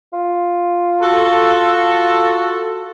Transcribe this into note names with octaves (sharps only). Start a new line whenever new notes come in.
F4
F#4 A4